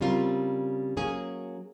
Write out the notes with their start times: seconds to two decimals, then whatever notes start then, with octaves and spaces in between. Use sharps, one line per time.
0.01 C#3 G3 C4 F4 A#4
0.97 F#3 A#3 C#4 G#4